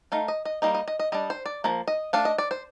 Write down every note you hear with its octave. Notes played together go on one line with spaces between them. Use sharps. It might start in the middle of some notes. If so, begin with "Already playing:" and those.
A3 D#4 F5
D#5
D#5
G3 A#3 D#4 D#5
D#5
D#5
D#5
G3 D4 D#5
C5
D5
F3 A#3
D#5
A3 D4 F5
D#5
D5
C5